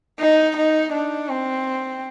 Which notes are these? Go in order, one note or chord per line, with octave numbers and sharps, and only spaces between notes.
D#4
D#4
D4
C4